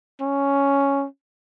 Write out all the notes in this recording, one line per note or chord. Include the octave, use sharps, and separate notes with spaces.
C#4